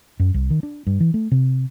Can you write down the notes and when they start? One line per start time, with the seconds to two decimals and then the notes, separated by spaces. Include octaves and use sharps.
0.20 F#2
0.34 C2
0.50 D#3
0.63 D4
0.87 G2
1.00 E3
1.14 A3
1.31 C3